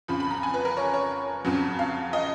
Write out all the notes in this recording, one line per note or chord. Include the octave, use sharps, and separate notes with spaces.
F2 C#3 F3 B5
B5
A#5
G#5
B4
A#4
C#5
C#5
F2 C#3 F#3
F5
D#5